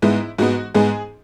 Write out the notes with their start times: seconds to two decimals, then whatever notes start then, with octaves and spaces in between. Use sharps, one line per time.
0.02 G#2 G#3 B3 E4
0.38 G#2 G#3 B3 F#4
0.74 G#2 G#3 B3 G#4